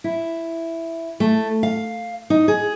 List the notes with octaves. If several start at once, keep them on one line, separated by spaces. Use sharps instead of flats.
E4
A3
F5
D#4
G#4